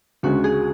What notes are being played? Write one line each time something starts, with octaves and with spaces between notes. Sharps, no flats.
D2 C#3 G#3 C#4 F#4
G#4